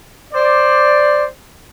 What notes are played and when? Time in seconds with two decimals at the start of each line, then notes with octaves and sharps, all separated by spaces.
0.33 C5 D5